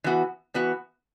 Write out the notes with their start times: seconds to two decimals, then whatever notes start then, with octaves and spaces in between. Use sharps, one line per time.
0.04 E3 B3 F#4
0.54 E3 B3 F#4